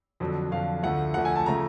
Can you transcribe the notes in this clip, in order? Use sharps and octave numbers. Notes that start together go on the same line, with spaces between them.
F2 D3 F#3
F2 D3 F#3 F5
D2 D3 F3 A3 F#5
D2 D3 F3 A3 F#5
G#5
A5
C#3 F3 A3 A#5